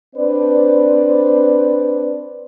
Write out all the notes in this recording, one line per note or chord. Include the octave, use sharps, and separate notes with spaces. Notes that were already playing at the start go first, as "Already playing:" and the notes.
C4 D4 B4 C5 D5